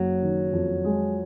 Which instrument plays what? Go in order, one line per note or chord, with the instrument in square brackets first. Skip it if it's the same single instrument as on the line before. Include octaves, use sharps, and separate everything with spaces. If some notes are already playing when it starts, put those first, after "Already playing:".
Already playing: [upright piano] F#1 [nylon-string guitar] F#3
[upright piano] D#3
F2
G#3